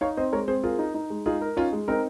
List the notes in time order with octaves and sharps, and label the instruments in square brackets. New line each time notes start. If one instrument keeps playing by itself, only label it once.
[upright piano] D#4 [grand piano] C#5 F5
[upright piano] C4 [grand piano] C5 D#5
[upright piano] G#3 [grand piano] A#4 C#5
[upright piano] C4 [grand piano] G#4 C5
[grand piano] F4 G#4 [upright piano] A#4
[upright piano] D#4
D#4
G#3
[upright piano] D#4 [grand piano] F4 G#4
[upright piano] A#4
[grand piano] C#4 F4 [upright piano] D#4
[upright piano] G#3
[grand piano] C4 D#4 [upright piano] A#4